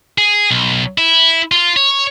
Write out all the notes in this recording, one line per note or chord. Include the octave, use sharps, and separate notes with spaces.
G#4
B1
E4
F4
C#5